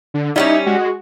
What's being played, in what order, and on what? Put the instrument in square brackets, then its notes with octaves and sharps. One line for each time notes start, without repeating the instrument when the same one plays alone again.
[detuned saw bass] D3
[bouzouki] G3 B3 C#4 [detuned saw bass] D#4 [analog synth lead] E4
[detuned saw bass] G#3 [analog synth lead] F#4